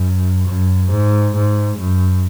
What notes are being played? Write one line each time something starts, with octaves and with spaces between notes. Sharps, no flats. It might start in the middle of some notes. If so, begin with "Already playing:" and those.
Already playing: F#2
F#2
G#2
G#2
F#2